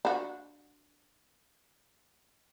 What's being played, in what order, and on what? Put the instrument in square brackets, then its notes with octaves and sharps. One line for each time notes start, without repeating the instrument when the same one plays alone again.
[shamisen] D4 F#4